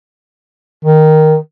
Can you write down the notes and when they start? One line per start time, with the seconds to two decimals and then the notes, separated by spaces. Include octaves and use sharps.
0.85 D#3